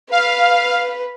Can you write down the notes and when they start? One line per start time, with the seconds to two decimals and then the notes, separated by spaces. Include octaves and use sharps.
0.11 B4 F5